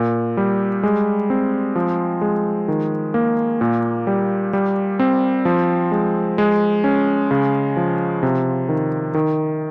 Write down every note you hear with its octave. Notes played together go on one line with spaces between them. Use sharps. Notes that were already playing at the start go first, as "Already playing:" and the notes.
Already playing: A#2
G3
G#3
C4
F3
G#3
D#3
A#3
A#2
G3
G3
C4
F3
G#3
G#3
C#4
C#3
F3
C3
D#3
D#3